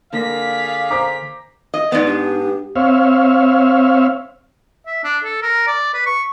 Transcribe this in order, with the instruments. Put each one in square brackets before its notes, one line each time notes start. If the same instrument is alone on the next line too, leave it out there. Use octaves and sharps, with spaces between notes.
[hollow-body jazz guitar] D3 A#3 [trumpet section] G#4 D5 F5 [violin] B6
[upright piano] C5 A#5 D6
[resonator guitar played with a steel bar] D#5
[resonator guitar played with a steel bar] G#2 B3 [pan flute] D5
[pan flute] D4 [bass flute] G4
[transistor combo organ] C4 C#5 E5 F5
[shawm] E5
D4
A4
A#4
D5
B4
C#6